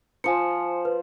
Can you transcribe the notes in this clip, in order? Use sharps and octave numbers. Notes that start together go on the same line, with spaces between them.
F3 C5 G#5 C#7
B4